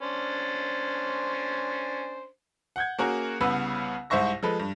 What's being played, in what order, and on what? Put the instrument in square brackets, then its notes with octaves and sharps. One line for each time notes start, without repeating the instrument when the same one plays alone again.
[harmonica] C#4 D4 C5
[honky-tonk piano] F#5 G6 G#6
A#3 C#4 F#4 G#4 A#4
C2 C#3 B3 B4 E6
C2 G#2 C5 E5 C#6 A#6
F3 G#3 A4 B4
G2